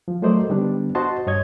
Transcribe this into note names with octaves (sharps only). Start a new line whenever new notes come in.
F3
F#3 A3 A#4 C5 D5 D#5
D3 G3 B3 D4
F#4 C5 D#5 A5 C6
G2 C#5 D#5 G#6